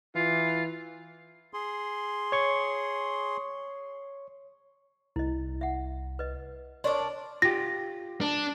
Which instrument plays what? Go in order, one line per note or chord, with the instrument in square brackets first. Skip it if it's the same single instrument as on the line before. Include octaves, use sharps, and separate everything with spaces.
[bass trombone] E3 [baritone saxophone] F4
[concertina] G#4 C6
[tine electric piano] C#5 C#6
[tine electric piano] C2 [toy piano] E4 D#5
[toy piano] E5 F#5
B4 D#5
[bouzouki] D4 A#4 D5 [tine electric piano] C#5 [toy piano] C6 C#6
[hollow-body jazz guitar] F4 G4 [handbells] A#6
[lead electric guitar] D4